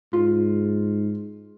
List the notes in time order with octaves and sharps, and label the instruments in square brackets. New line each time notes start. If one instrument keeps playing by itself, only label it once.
[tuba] G#2 [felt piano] F4